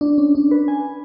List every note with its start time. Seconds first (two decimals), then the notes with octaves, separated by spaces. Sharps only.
0.01 D4
0.18 C#4
0.35 D4
0.51 B4
0.68 G#5